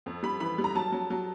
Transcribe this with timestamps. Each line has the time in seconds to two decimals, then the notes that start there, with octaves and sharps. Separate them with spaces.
0.06 F2
0.23 G3 B5
0.40 E3 B5
0.58 G3
0.64 A#5
0.75 F#3 A5
0.92 F#3
1.10 F#3